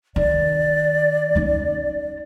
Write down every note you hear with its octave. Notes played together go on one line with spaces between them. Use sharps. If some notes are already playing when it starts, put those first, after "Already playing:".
D#3 D5
C#4 D#4